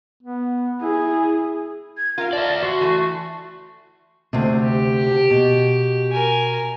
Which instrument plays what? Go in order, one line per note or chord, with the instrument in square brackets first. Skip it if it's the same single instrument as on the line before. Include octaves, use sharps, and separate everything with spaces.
[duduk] B3
[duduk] E4 [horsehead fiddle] G#4
[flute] G#6
[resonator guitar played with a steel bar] F4 F5 [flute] A#4
[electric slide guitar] D5 E5 [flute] A5
[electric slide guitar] F#4 [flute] C6
[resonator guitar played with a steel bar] E3 A3
[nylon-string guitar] D2 C3
[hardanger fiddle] G4
[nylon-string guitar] B2
[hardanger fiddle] A#4 G#5